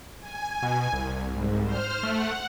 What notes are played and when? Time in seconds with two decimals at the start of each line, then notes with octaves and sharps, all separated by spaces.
0.19 G#5
0.63 B2
0.93 C2
1.29 G#2
1.62 C5 F6
2.03 A3 F#5